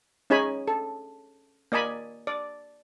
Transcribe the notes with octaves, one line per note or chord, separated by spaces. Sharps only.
C#4 D#4 G#4 C#5 G#5 B5
A4
A#3 D5 D#5 G#5 B5
D5